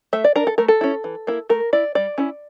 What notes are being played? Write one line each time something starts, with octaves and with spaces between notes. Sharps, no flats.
A3 E5
D5
D4 A#4
A4
A3 A#4
A4
C#4 E4
E3
A#3 E4
A3 A#4
E4 D5
G3 D5
C#4 E4